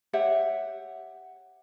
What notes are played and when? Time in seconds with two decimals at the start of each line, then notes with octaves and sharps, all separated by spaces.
0.13 G4 C#5 E5 F#5